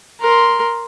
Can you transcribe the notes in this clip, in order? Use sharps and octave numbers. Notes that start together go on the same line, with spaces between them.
A#4 C6